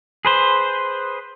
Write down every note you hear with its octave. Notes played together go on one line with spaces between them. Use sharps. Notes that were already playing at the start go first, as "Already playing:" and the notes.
G#4 B4 C5